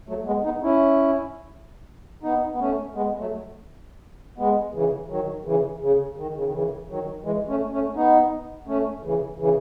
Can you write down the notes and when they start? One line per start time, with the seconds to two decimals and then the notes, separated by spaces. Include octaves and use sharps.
0.09 F#3 A3
0.27 G#3 B3
0.44 B3 D#4
0.63 C#4 E4
2.23 B3 D#4
2.52 B3
2.59 A3 C#4
2.95 G#3 B3
3.19 F#3 A3
4.38 G#3 B3
4.74 C#3 E3
5.09 D#3 F#3
5.45 C#3 E3
5.81 C#3
6.17 D#3
6.36 C#3
6.44 D#3
6.53 C#3 E3
6.88 D#3 F#3
7.24 E3 G#3
7.48 A3 C#4
7.72 A3 C#4
7.96 B3 D#4
8.67 A3 C#4
9.04 C#3 E3
9.39 C#3 E3